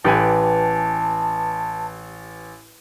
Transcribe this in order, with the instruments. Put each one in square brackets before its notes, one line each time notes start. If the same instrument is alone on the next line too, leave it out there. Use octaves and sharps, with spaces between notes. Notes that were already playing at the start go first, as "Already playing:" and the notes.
[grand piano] A1 [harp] G4 B4 G#5 [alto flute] A5